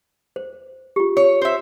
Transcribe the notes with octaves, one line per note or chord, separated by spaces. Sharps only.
C5
F4 G4
C#5
C5 E5